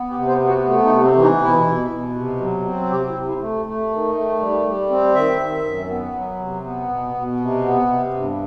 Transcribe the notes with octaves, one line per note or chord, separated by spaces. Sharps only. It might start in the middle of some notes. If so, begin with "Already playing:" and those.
Already playing: B3
G4
C3
C5
B3
F#4
A3
D#4
C3
C4
E3
D#4
B2 E4
B2
B2
C3
F#3
C4
C3 G4
E4
C3
E4
A3
A3
D#3
A3
G3
G3
C4
D#3 E5
D#3
F#2
B3
F#3
C3
B3
B2
B2
C3
B3
C3
G2